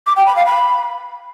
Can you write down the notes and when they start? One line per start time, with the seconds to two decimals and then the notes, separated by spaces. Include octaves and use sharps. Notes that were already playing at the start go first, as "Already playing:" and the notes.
0.06 D6
0.16 G5
0.26 B5
0.36 F5
0.46 B5